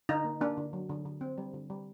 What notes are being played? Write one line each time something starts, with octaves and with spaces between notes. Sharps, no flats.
D3 D#4
A#3
A#3 D4
D3
F#3
D3
D3
C4
G3
D3
G3